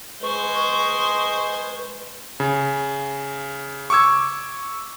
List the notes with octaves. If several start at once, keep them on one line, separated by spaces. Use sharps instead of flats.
G#3 B4 C5 C#6
C#3
C#6 D6 E6 G#6